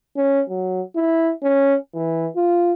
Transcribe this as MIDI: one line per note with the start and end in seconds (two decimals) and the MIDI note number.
0.17 0.42 61
0.49 0.81 54
0.96 1.33 64
1.43 1.76 61
1.94 2.27 52
2.36 2.73 65